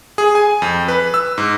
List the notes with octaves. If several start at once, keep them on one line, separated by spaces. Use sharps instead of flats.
G#4
G#5
F2
B4
E6
G#2